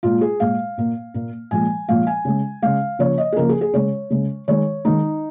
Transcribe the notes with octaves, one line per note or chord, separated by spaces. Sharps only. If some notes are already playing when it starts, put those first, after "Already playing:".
A#2 G#3 F4
G#4
A#2 G#3 F5
A#2 A#3
A#2 A#3
A#2 F3 G#3 G#5
A#2 F3 G#3 F5
G#5
C#3 G#3
C#3 G#3 F5
C#3 F3 A#3 C#5
D#5
G#4
C#3 F3 A#3 A#4
G#4
G#4
C#3 G#3 C#5
C#3 G#3
D#3 G#3 C#5
D#3 G#3 D#4